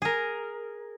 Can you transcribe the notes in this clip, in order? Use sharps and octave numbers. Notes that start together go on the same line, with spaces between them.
G#4 A#4